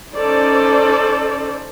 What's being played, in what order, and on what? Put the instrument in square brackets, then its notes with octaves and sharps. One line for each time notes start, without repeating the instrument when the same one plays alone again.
[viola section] C#4 D#4 A4 C5 D5